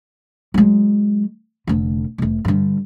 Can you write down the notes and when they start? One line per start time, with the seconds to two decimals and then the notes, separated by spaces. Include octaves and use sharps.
0.54 F#3 G#3
1.67 F1 D3
2.18 F1 C3
2.45 G2 D3